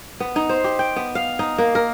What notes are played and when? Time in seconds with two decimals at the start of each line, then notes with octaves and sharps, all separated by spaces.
0.20 B3
0.36 D#4
0.49 C5
0.64 G4
0.79 G5
0.96 B3
1.15 F5
1.39 D#4
1.58 A#3
1.75 A#4